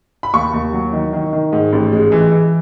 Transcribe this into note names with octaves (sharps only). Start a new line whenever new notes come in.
B5
D#2 C#6
D#2
F#3
D#3
D#3
D#3
G#2
A1
G#3
E3
E3